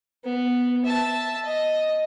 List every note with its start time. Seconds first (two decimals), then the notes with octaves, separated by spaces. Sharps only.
0.24 B3
0.85 E5 A5
1.45 D#5